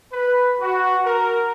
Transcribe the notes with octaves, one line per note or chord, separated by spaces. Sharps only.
B4
F#4
A#4